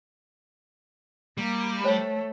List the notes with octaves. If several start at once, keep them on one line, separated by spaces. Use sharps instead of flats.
G3 A#3
A3 C5 C#5 G5